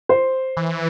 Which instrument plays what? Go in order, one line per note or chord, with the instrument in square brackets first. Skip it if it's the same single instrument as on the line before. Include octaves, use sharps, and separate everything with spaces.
[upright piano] C5
[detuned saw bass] E3